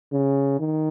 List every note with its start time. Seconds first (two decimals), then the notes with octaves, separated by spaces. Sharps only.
0.12 C#3
0.59 D#3